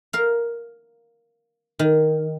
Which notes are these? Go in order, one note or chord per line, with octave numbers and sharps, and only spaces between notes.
A#4 F5
D#3